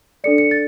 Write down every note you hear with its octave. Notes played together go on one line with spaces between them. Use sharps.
D4 A4 D5 C#7
C#7
A6